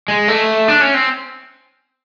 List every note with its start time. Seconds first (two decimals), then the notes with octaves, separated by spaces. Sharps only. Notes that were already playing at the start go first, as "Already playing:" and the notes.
0.08 G#3
0.28 A3
0.68 D4
0.81 C#4
0.94 C4